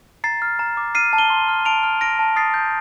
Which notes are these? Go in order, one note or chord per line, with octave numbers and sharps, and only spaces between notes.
A#5 A6 C7
F6
A#5
D6
F6 C7 D#7
A5
D#7 G7
C6
F6
A5 D7 F7
F6
F6 A#6 D7
A5
D#6 A6 C7
G6